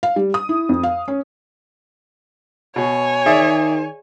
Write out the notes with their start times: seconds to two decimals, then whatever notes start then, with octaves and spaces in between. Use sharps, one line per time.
0.03 F5
0.16 G3
0.34 D#6
0.49 E4
0.69 F2
0.83 F5
1.08 C#4
2.76 B2 C#5 G#5
3.26 D#3 G#4 D5 E5